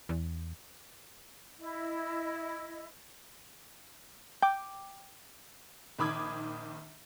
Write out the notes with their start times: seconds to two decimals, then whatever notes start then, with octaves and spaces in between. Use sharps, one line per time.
0.09 E2
1.59 E4 D#5
4.43 G5 D6
5.99 A#1 D#3 B5 D6 D#6 G#6